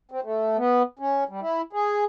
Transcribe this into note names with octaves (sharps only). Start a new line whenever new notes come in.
C4
A3
B3
C#4
G3
E4
G#4